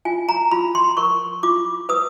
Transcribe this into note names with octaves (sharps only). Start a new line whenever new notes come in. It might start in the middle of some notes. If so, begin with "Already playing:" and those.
F4 G#5
A#5
F4 B5
C6
A#4 C#6
F4 D6
B4 D#6